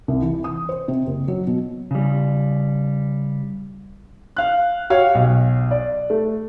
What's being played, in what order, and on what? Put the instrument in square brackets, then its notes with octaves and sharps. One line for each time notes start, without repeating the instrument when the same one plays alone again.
[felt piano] C2
E3
D#6
C5
C3
F#1
F#3
B2
[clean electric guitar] C#3 G3
[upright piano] F5 F#6
F#4 G4 C#5 F5
B1
D5
A3